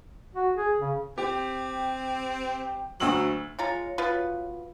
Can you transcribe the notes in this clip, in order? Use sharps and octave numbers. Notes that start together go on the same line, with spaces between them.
F#4
G#4
C#3
C4 G4
D2 F#3 E6 F#7
G#3 F4 C#5 A#5
B2 F4 B4